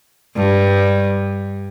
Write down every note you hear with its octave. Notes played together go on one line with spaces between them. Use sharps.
G2